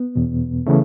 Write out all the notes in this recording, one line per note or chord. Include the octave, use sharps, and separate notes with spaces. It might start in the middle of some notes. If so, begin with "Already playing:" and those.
Already playing: B3
E2 B2
C#3 E3 A3